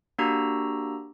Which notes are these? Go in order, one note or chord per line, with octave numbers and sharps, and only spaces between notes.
A#3 D4 F#4 G4 A#5 E6